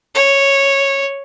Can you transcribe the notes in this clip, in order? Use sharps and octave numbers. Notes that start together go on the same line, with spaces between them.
C#5